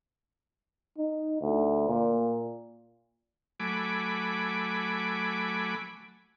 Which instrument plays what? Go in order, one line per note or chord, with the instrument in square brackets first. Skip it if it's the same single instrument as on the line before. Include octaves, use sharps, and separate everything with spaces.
[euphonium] D#4
D2
A#2
[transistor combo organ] F#3 A3 G#5 B5 D6